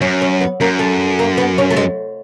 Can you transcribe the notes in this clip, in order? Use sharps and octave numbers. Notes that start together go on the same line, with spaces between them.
F#2 C#4
C#4
B3
F#2 A#3
A3
A#3
B3
C#4
A3
G#3